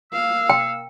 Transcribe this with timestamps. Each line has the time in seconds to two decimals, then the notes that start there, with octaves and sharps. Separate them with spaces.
0.13 A#3 F5 E6
0.50 G5